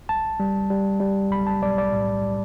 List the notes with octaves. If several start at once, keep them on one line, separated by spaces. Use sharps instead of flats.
B1 A5
G3
G3
G3
B1 B5
A5
B1 D5
D5
A2